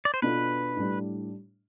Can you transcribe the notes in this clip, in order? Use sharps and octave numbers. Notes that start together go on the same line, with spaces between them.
D5
C5
B2 B3 D4 F4 A4 B4
A2 G3 D4